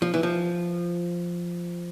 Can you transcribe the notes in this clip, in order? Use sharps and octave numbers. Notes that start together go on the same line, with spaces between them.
F3
E3
F3